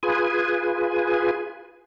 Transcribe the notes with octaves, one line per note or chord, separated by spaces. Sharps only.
F4 G#4 B4 G#5